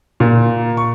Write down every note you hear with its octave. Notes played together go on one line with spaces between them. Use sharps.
A#2
C#6